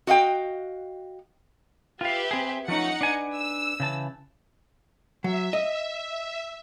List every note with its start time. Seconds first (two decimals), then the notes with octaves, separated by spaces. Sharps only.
0.07 F#4 D#5 F5 G5
2.01 F4 G4 B4 E5 F5
2.31 C4 G#4
2.68 F3 A3 C#4 D#4 F#5 C#7
3.01 D4 B4 G#5
3.34 E6
3.80 C#3 E3 A5
5.24 F#3 E5
5.53 D#5